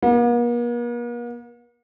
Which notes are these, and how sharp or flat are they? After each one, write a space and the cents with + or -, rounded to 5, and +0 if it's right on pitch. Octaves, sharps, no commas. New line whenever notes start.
A#3 +45